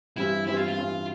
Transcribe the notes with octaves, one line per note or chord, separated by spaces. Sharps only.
G2 E3 G3 C4 E4
G2 E3 G3 C4 E4
F4
F4
G2 E3 G3 C4